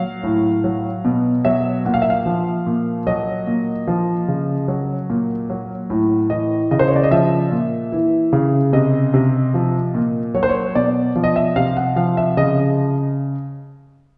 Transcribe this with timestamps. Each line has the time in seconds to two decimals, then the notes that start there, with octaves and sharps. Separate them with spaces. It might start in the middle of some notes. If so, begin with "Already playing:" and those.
Already playing: A#2 F#3 F5
0.23 A2
0.64 F#3
1.05 B2
1.45 F#3 E5
1.85 A#2 F#5
1.94 F5
2.02 E5
2.10 F5
2.26 F3
2.66 A#2
3.07 F#3 D#5
3.47 A#2
3.87 F3
4.28 C#3
4.68 F#3
5.10 A#2
5.50 F#3
5.90 A2
6.30 E3 D#5
6.71 C#3 D#5
6.79 C5
6.88 C#5
6.96 D5
7.03 D#5
7.11 F3 E5
7.52 A#2
7.92 E3
8.33 C#3
8.73 C3 D#5
9.14 C3
9.54 F3
9.95 A#2
10.35 F#3 C#5
10.43 C5
10.49 C#5
10.75 B2 D5
11.16 F3
11.24 D#5
11.36 E5
11.56 C3 F5
11.77 F#5
11.96 F3 F5
12.17 E5
12.37 C#3 D#5